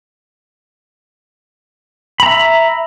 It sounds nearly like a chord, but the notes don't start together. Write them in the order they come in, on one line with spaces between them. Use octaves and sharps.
B5 A#5 E5